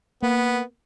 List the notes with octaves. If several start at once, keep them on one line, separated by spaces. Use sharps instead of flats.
A#3 B3